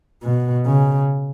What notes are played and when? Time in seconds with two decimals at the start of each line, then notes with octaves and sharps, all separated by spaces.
0.23 B2
0.67 C#3